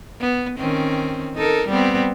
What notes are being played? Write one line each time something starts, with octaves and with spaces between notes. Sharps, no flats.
B3
D#3 C4 C#4
D#4 A4 A#4
G3 B3 C4